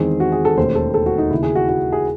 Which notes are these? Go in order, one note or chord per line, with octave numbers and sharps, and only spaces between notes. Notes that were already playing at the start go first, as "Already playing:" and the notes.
Already playing: E2 D#3 G#3 C4 G#4
F#4
G#4
A4
E1 D#2 D#3 A3 C#4 C5
A4
A4
F#4
D#4
D#2 C#3 E3 E4
G#4
F#4
F#4
G#4